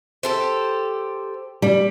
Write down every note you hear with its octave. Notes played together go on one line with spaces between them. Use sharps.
G4 A4 C5
G3